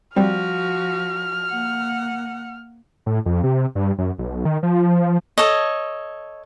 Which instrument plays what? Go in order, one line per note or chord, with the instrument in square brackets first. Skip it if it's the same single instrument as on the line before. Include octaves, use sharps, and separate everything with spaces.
[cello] F3 F#4 [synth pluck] G3 C4 [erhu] F6
[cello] A#3 F#5
[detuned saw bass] A2
F2
C3
G2
F#2
B1
D#3
F3
[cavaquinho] A4 C#5 D#5